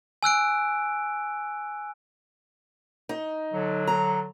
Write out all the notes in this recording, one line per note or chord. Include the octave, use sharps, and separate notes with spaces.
G#5 E6 F#6 D7
D#4
D3 F#3
A#5